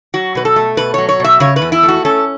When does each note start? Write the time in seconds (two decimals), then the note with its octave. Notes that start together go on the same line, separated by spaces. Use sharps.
0.14 F#3 F#4
0.35 B2 B4
0.45 A4
0.56 A3
0.77 B2 B4
0.94 F#3 C#5
1.09 C#5
1.20 B2 E5
1.40 C#3 C#5
1.56 B4
1.62 E2
1.72 E4
1.83 A3
1.88 F#4
2.05 C#4 A4